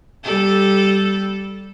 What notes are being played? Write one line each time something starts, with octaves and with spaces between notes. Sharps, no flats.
G3 A4